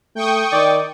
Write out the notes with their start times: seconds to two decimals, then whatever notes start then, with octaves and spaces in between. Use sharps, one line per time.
0.16 A3 G5 C#6 D#6
0.52 D#3 D5